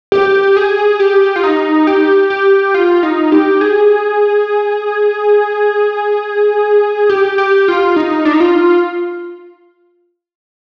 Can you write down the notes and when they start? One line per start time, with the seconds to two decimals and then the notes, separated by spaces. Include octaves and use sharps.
0.12 G4
0.57 G#4
1.00 G4
1.36 F4
1.43 D#4
1.87 G4
2.30 G4
2.74 F4
3.03 D#4
3.32 G4
3.61 G#4
7.09 G4
7.38 G4
7.68 F4
7.96 D#4
8.25 D4
8.33 D#4
8.40 F4